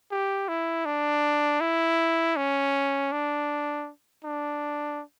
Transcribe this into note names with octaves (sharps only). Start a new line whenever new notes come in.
G4
E4
D4
E4
C#4
D4
D4